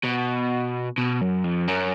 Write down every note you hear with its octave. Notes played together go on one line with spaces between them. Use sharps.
B2
B2
F#2
F2
F#2